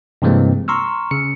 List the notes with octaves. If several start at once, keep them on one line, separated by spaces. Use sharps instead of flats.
G2 C3 E3 G#3 A#3 C4
A#5 C6 C#6 E6 F6
C#3 C#7